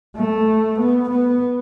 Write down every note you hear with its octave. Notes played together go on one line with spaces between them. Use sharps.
A3
B3
B3